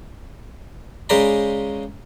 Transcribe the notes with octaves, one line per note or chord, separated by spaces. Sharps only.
C#3 G#3 C5 D5 A#5 B5